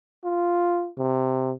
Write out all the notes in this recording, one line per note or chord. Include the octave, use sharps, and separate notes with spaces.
F4
C3